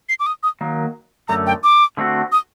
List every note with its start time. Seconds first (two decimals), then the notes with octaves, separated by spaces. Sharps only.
0.09 C7
0.20 D6
0.26 D#6
0.43 D#6
0.61 D#3 F#3 A#3
1.28 F#2 D3 A3 A#5
1.47 G5
1.64 D6
1.97 D3 A3 C4 F#4
2.32 D#6